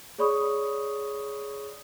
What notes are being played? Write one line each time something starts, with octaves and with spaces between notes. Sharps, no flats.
G#4 C#5 D5 B5 C#6 D#6